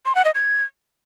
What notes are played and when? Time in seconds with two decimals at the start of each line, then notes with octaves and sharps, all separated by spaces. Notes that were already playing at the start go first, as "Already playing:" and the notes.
0.05 C6
0.15 F#5
0.25 D#5
0.35 G#6